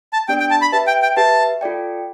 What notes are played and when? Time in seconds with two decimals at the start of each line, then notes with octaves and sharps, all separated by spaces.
0.13 A5
0.28 B3 D4 G4 D5 G5
0.40 G5
0.51 A5
0.62 B5
0.72 G4 B4 E5 A5
0.87 G5
1.02 G5
1.17 G4 B4 E5 A5
1.61 F4 A4 D5 G5